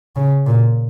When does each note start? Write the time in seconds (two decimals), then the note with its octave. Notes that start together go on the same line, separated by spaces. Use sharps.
0.16 C#3
0.46 A#2